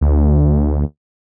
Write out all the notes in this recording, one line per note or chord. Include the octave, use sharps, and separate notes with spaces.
D2